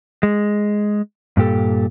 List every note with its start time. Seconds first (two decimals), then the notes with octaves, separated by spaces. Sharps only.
0.23 G#3
1.37 G2 A#2 G4 A4